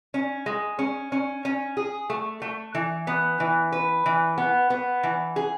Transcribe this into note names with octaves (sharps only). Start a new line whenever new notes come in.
C#4
G#3
C#4
C#4
C#4
G#4
A3
A3
E3
B3
E3
B4
E3
B3
B3
E3
G#4